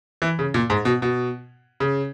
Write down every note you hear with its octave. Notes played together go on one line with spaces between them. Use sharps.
E3
C#3
A#2
G#2
B2
B2
C#3